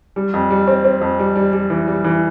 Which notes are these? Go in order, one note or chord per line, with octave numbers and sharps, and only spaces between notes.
G3
F2
G3
C4
C4
F2
G3
G3
G3
E3
G3
E3